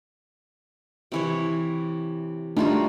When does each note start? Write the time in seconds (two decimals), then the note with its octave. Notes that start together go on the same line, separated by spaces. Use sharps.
1.12 C3 E3 C#5
2.57 G3 A3 D4 D#4 F4 F#4